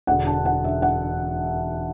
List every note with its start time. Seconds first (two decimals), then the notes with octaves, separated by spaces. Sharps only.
0.07 E1 E2 D3 F#5
0.27 A5
0.45 F#5
0.64 E5
0.82 F#5